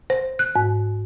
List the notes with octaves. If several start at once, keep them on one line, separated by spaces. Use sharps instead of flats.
C5
F#6
G#2